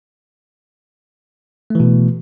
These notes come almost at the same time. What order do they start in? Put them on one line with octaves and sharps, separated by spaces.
A3 E3 B2